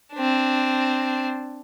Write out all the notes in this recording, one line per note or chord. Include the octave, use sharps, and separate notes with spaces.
C4 D4